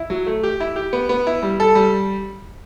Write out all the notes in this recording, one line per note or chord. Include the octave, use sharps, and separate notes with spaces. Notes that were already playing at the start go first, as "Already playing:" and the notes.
Already playing: E4
F#3
A3
G4
E4
G4
B3
B3
E4
G3
A4
G3